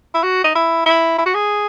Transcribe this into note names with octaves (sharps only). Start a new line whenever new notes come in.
E4
F#4
D#4
E4
E4
E4
F#4
G#4